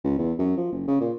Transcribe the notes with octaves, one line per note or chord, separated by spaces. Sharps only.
C#2
E2
F#2
F3
F#1
C#3
A#2